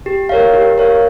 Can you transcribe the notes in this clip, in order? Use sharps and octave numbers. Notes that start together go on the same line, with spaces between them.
G4
A#4 C#5 F5
G4
A#4 C#5 F5